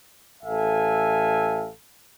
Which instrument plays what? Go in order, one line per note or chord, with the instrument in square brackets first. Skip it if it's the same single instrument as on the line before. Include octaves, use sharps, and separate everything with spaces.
[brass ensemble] A1 A4 E5 F5 G#5